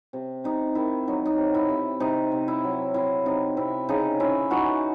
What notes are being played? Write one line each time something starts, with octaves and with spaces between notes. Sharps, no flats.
C3
C3 D#4
D#3 E4
F#3 D#4
D#4
C3
E4
C3
C3 D#4
C3
E4
F#3
C4 E4
C3 D#4
C3 E4
C#3 D#4
C#4 E4
E3 D#4 F#4